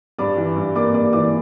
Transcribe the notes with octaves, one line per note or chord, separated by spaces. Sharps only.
G2 D5 D6
E3
G2
A#3 D5 D6
G2 D5 D6
E3 D5 D6